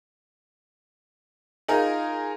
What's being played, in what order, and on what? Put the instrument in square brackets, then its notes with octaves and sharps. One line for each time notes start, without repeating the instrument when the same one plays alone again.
[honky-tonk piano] D#4 F4 G#4 A#4